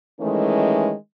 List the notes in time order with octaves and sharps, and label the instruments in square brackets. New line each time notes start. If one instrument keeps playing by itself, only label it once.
[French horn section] D#3 E3 G#3 A3 C#4